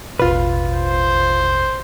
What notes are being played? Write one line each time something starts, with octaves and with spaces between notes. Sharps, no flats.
A1 E2 B2 F4 B4
C5